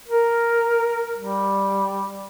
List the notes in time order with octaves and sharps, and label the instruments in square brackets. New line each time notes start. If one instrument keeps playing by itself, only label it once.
[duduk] A#4
G3